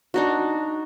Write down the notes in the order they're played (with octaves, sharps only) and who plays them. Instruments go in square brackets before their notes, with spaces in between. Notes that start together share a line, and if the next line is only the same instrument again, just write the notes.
[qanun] D4 D#4 F#4